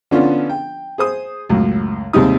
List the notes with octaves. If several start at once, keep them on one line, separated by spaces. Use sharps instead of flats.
D3 F3 B3 C#4 D4 F4
G5
G#4 C5 D#6
C#2 F#2 A2
D#2 C3 G3 G#3 D#4 D#6